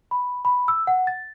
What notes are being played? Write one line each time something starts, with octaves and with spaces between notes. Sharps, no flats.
B5
B5
E6
F#5
A6